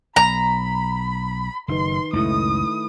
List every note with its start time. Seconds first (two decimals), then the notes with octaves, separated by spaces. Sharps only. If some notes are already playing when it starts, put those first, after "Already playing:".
0.16 B1 A#5 B5
1.68 F#1 D#3 D#4 B4 C6
2.13 C#2 F#2 A2 A3 E4 D#6